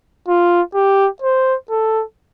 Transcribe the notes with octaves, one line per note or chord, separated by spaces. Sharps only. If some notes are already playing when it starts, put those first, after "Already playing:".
F4
G4
C5
A4